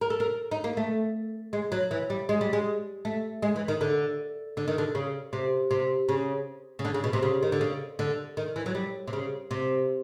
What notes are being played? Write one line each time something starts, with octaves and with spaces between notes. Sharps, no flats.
A#4
A4
A#4
D#4
A#3
A3
G#3
F#3
E3
G3
G#3
G3
G#3
A3
G#3
E3
D#3
D3
D3
D#3
D3
C#3
C3
C3
C#3
C#3
D3
C#3
B2
C3
C#3
D#3
D3
C#3
D3
D#3
E3
F#3
G3
C3
C#3
C3